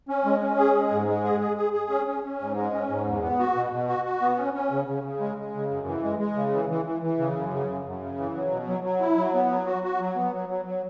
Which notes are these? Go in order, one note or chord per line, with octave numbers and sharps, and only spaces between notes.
C#4
G#3
C#4
G#4
G#3
G#2
G#3
G#4
G#4
G#4
G#4
C#4
C#4
C#4
G#2
G#3
C#4
G#2
E2
B3
F#4
B2
B2
F#4
F#4
B3
C#4
C#4
C#3
C#3
C#3
G#3
G#3
C#3
F#2
E3
G#3
G#3
C#3
E3
E3
E3
E3
C#3
F#2
C#3
F#2
F#2
C#3
E3
F#3
B2
F#3
F#3
E4
F#3
B3
F#3
F#4
F#4
F#3
B3
F#3
F#3
F#3